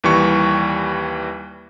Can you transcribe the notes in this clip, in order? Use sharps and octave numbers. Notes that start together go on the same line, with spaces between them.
D#2 E3 G3 C#6